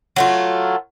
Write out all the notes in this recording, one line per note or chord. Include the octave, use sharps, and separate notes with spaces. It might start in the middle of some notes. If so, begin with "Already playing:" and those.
F#3 A3 F4